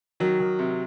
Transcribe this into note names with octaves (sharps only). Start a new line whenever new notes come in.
D#3 F#3
D#3
C3